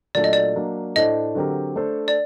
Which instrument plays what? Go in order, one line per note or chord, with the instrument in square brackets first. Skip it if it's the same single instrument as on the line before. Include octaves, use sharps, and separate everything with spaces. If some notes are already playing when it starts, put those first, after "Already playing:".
[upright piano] A#2 F#3 A3 D4 A4 [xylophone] D5
[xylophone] D#5
D5
[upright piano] F#3 A#3 D4
[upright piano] A2 A3 D4 A4 C5 [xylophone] D#5
[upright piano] D3 F#3 C4 G4 A#4
A3 D4 A4 C5
[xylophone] D5